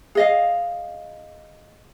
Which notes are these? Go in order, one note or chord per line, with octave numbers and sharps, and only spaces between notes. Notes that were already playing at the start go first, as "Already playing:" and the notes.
G#4 D#5 F5